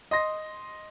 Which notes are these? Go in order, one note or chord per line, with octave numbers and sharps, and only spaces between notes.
D#5 C6 A#6